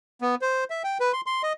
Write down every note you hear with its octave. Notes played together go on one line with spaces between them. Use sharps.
B3
C5
E5
G5
B4
C6
C6
D#5